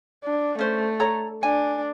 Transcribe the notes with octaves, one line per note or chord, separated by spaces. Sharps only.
D4
A3 C#4 C5
A4 C#5 A#5
D4 G#5